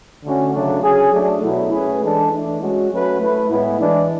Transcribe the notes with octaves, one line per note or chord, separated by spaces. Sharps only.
D3 A3 C#4 F#4
C#3 F#3 A3 D4
F#3 C#4 G#4
F#3 A3 D4
B2 F#3 A3 E4
A3 C#4 G#4 B4
E3 G#3 D4 A4
E3 A3 D4
G#3 C#4 F#4
F#3 A3 C#4 F#4 B4
A3 E4 B4
A2 G#3 B3 E4 B4
E3 G#3 D4